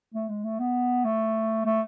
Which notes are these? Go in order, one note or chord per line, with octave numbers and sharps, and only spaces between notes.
A3
G#3
A3
B3
A3
A3